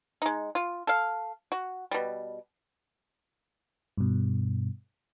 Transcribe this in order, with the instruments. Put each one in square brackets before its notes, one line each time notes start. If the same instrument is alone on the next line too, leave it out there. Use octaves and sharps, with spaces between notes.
[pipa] G#3 D#4
F4
A4 F5
F#4
B2 G3
[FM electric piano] G2 B2